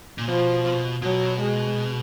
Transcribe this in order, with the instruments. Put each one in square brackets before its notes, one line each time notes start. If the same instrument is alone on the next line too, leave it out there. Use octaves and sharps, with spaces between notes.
[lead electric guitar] A#2
[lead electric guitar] B2 [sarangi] F3
[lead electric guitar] B2 [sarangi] F#3
[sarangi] G#3